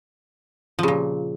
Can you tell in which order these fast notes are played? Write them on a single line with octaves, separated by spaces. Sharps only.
F3 C#3 A#2